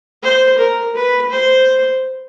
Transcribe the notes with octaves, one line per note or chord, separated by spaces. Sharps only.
C5
A#4
B4
C5